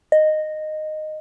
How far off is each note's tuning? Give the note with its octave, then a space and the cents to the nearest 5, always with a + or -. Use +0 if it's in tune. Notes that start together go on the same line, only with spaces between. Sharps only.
D#5 -10